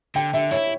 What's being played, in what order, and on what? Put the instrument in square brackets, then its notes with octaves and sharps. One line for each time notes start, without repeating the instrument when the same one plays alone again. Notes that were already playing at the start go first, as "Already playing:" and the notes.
[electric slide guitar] D3 [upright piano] G5
[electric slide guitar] D3 [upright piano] E5
[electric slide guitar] E4 [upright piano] C#5